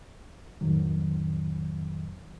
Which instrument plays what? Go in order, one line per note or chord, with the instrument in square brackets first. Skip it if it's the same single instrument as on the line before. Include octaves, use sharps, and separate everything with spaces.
[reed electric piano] F2 A2 D#3 F#3